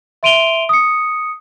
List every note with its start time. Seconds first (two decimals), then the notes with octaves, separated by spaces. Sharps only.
0.23 E5 C6 D7 D#7 F7 G7
0.69 D#6 C#7